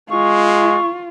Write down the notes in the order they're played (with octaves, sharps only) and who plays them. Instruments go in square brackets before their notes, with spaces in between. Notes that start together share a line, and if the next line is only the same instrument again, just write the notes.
[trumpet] G#3 [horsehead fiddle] F4 [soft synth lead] C#6